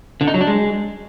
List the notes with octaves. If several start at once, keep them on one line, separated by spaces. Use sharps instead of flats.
D3
D#4
F#3
D4
G#3